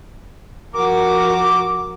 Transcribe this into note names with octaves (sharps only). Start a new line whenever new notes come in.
F3 F#4 A#4 D6